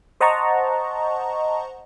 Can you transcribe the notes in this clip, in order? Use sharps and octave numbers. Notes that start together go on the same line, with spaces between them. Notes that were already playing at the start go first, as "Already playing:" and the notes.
C5 D#5 F#5 A5 A#5 C#6